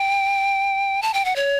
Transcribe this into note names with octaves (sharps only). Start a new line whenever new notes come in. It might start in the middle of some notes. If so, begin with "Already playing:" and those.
Already playing: G5
A5
G5
F#5
C#5